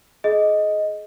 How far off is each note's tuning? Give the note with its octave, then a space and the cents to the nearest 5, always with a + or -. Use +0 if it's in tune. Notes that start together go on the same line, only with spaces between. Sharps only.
G#4 +35 D#5 +5